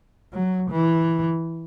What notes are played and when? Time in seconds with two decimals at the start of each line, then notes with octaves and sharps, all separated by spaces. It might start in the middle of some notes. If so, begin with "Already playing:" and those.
0.33 F#3
0.71 E3